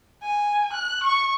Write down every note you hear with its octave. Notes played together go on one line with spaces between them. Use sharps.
G#5
F#6
C#6